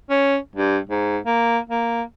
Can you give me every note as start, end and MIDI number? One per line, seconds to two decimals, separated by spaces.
0.10 0.37 61
0.56 0.78 43
0.89 1.18 44
1.26 1.58 58
1.69 2.02 58